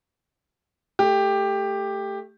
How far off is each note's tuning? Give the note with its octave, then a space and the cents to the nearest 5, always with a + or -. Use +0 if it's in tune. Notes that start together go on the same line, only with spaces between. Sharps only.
A3 +0 G4 +10